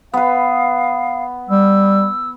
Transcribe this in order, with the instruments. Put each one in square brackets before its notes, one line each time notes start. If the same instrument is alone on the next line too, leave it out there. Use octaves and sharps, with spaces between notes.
[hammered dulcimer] B3 B4 [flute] F5
[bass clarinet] G3 [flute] E6